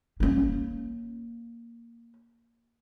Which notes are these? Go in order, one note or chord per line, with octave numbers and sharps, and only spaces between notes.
A#3 C#4